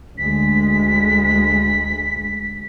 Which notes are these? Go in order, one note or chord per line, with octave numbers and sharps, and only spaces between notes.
D2 G#3 B6